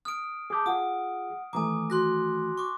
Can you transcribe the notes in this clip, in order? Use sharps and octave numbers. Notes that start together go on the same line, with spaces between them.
D#6 F6 D7
G#4 A5 D6 D#6 G6
F4 G#4 F#5 D#6
D#3 E3 A3 G#5 A#5 D6 D#6
F#4 C6 F#6 A#6
C#6 D6